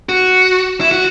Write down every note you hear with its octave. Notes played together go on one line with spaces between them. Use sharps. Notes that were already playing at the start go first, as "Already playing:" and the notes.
F#4
E4
F#4